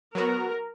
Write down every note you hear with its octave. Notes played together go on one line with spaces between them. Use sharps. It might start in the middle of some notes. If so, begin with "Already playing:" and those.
F#3 B3 F#4 A#4